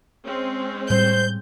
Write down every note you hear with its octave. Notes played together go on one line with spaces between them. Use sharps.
G#3 C4 C#4
A2 G3 C5 G6